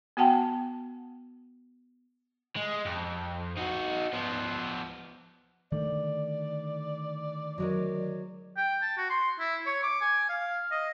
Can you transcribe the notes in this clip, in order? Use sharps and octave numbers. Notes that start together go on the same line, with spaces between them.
B3 F#4 F#5 G5 A5
G#3
F2
D#4 F#4
F3 B3
D3 D#3 A3 D5
F#3 G#3 A#4
G5
A5
F#4
C6
E4
C#5
D6
G#5
F5
D#5